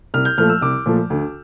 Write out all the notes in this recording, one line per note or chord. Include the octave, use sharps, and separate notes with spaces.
C2 F6
G6
A#2 F3 A3 F6
E6
C2 D6
A#2 F3 A3
D2